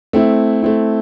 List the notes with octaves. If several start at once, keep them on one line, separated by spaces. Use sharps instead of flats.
A3 C4 E4
A3 C4 E4